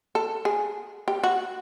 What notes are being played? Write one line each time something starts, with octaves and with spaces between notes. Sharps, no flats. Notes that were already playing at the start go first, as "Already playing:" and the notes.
A4
G#4
G4
F#4